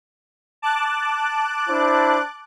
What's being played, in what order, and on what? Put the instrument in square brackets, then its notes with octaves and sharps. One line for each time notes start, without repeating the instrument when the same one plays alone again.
[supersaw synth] A5 D6 F#6
[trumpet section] D4 E4 C5